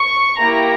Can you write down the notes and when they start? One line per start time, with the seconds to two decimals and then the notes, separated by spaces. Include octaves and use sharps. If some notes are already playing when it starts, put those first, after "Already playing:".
Already playing: C#6
0.39 A#3 E4 G4 A#5